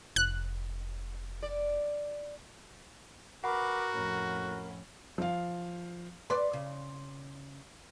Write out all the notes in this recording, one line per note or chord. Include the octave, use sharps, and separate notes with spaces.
F1 F#6
D5
F#4 A#4 B4 F#5 B5 D6
F2 A2 C#4
F3 F5
B4 D5 C6
C#3